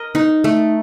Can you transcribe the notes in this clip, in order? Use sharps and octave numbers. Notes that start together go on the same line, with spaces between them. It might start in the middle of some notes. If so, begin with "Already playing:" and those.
Already playing: A#4 D#5
D#4
A3